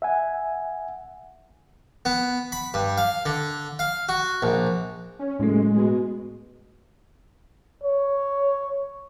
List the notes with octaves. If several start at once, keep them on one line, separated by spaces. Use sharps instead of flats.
E5 F#5 G#5
B3
B5
G2
F5
D3
F5
F#4
A#1
C#4
F#1 A2 G#3 A3
B2
C#5